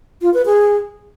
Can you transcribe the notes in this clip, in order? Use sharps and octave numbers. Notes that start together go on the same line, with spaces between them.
F4
B4
G#4